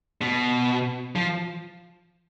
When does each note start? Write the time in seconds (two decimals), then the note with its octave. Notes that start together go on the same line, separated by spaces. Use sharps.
0.21 B2
1.16 F3